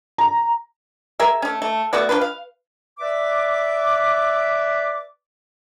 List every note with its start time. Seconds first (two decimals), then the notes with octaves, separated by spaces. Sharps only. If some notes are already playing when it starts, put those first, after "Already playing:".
0.18 A#5
1.20 G#4 A#4 E5
1.42 A3 C#4
1.62 A3
1.93 A3 B3 F#4 D5
2.09 F3 A#3 D4 B4
2.21 F5
2.99 B4 D5 E5 D6